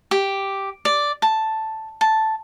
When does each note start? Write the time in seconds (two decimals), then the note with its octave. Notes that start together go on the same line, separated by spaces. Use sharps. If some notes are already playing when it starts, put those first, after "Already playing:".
0.11 G4
0.85 D5
1.22 A5
2.01 A5